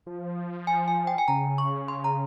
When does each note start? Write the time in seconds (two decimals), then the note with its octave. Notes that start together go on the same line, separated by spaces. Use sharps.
0.06 F3
0.67 G#5
0.88 G#5
1.07 G5
1.18 G#5
1.28 C#3 A#5
1.58 C#6
1.88 C6
2.04 A#5